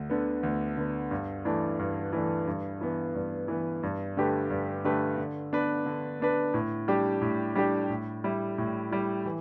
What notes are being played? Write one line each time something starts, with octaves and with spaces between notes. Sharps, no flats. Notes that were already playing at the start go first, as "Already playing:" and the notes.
Already playing: D2
D3 B3
D2
D3 B3
G2
E3 A3 D4
G2
E3 A3 D4
G2
E3 B3
G2
E3 B3
G2
D3 A3 G4 B4
G2
D3 A3 G4 B4
D3
B3 D4 B4
D3
B3 D4 B4
A2
G3 D4 G4
A2
G3 D4 G4
A2
G3 E4
A2
G3 E4
E3